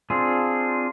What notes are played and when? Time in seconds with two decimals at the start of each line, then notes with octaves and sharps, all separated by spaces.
0.10 C4 D4 F4 G#4